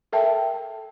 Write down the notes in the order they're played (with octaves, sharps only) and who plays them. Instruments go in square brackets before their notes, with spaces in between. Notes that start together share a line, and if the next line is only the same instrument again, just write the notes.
[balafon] A4 A#4 E5 G5 A5